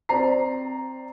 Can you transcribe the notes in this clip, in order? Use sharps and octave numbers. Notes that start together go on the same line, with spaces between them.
C4 D5 A#5 C7